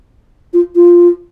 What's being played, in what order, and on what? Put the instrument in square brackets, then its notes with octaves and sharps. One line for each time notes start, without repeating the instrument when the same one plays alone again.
[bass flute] F4
F4